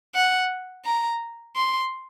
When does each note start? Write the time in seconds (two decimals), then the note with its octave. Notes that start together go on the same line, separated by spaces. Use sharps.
0.15 F#5
0.85 A#5
1.56 C6